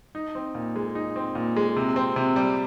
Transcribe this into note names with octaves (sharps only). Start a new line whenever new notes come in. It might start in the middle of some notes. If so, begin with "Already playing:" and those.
D#4
C4
A#2
G#3
D#4
C4
A#2
G#3
C3
C4
C3
G3